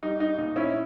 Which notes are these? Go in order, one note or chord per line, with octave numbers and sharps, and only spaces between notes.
G3 D#4
D#4
A#2 D#4
C#4 E4